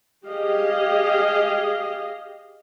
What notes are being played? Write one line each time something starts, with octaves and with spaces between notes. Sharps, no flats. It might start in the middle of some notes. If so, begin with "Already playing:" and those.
G4 G#4 D#5 F5